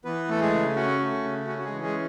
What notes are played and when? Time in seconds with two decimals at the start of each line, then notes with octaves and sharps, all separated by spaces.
0.05 E3 B3 B4
0.28 A3 A4
0.41 G#3 G#4
0.53 C#3
0.76 C#4 F#4
1.00 A3
1.24 C#3
1.47 C#4 F#4
1.58 F#4
1.65 G#3 G#4
1.71 E3
1.83 G#3 G#4